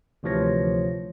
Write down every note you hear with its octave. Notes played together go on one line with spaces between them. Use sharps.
D2 C3 E3 F3 C#5 A#6